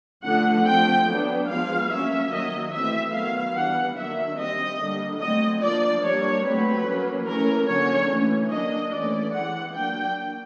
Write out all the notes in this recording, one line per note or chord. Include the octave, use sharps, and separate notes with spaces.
D3 F3 A3 D4 F#5
F3 A3 C4 G5
F#3 B3 D4
F3 G#3 B3 F5
F#3 A#3 C#4 E5
D#3 F#3 A#3 D#5
E3 A3 C4 E5
D#3 F#3 B3 F5
E3 G3 B3 D4 F#5
D#3 F#3 A#3 D4 E5
G3 C4 D#5
D3 G3 A#3 D4
F#3 A3 C4 D#5
F3 A#3 D4 D5
G3 A#3 D4 C#5
F#3 A3 C4 B4
F#3 A#3 C#4
E3 A3 C#4 A#4
D3 F#3 A#3 C#4 C#5
E3 A3 C#4
F#3 A#3 D4 D#5
E3 A3 C#4 D5
E3 G#3 C4 F#5
F#3 A#3 D4 G5